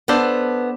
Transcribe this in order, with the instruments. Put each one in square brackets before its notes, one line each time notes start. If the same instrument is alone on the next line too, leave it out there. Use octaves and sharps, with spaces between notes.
[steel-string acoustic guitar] B3 [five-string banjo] D4 A4 C5